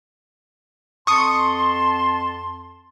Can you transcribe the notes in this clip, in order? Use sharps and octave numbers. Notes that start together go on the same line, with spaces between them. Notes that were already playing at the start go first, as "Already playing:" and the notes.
F2 A5 C6 C#6 D#6 C#7